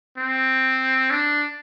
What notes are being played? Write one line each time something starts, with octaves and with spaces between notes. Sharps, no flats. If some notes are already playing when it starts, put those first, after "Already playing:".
C4
D4